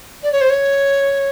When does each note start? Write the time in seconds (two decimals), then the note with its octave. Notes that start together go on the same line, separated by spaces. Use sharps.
0.23 D5
0.32 C#5
0.41 C5
0.50 C#5